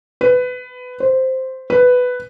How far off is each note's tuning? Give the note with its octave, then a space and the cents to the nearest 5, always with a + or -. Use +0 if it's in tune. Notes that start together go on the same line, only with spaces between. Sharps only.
B4 +20
C5 -5
B4 +10